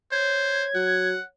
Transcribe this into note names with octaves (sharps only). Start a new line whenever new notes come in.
C5 C#5 G#6
F#3 F#5